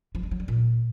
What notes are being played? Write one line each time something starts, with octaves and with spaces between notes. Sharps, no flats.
F3
G#3
F#3
G3
A#2